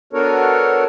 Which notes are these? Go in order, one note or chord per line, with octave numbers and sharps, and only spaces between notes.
B3 D4 F#4 A4 A#4 C#5